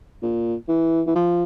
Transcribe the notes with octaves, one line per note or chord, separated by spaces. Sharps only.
A#2
E3
E3
F3